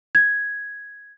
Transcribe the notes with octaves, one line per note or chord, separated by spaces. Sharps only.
G#6